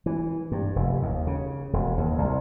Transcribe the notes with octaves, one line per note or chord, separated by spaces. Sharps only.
E3
G2
F1
D#2
C#3
E1
D#2
C2